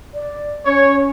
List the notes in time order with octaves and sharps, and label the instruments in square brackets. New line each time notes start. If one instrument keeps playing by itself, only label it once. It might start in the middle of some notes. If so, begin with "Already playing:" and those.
[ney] D5
[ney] C#4 [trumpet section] C#5